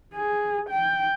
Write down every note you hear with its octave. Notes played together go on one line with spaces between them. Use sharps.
G#4
G5